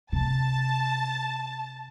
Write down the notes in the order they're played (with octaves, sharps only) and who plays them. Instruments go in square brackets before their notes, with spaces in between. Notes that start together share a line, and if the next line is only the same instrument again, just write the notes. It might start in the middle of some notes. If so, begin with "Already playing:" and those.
[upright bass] C3 [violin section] A5